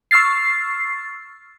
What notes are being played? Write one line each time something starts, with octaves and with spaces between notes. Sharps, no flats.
C#6 E6 F6 A6 C7